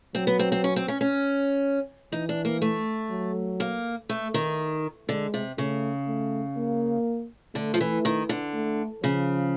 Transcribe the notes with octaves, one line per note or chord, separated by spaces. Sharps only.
F#3 C4
B3
C4
C4
C#4
C4
C#4
C#4
E3 D#4
D4
A#3
A3
F#3
A#3
A3
D#3
D3 G#3
C3
C#3 A3
A3
A#3
D3 A3
F3
E3
D#3
D3
A3
C#3 F3